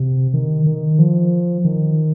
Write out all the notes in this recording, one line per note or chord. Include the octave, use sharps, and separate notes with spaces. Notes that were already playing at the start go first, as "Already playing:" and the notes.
Already playing: C3
D#3
D#3
F3
D#3